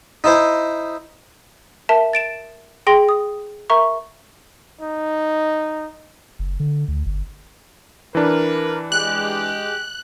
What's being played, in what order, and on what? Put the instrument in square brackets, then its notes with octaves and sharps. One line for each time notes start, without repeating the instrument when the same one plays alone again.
[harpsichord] D#4 E4 C5 G#5
[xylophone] A#4 E5 A5
A6 D7 E7
G#4 G5 C6 A#6
D#6
A#4 E5 A#5 C#6
[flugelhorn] D#4
[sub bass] F#1
D3
D2
G1
[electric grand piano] E3 D4 [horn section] A#4 B4
[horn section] G#3 G4 [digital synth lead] F#6